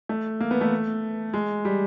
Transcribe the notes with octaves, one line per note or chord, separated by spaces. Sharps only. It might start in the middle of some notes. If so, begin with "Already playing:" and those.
A3
A#3
B3
A3
G#3
G3